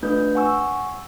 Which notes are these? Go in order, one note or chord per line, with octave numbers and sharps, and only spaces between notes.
A3 D4 F4 B4 G6
F#5 G#5 C#6 E6